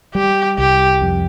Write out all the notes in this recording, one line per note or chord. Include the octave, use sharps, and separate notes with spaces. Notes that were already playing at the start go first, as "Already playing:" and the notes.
G3 G4
C2 G4
F2